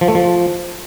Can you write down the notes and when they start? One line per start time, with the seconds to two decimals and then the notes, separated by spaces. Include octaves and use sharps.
0.01 F3
0.08 A3
0.15 F3